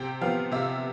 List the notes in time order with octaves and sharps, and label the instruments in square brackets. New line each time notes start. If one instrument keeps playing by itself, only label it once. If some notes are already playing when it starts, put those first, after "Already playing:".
Already playing: [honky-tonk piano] C3 G5
F3 B3 F5
C3 E5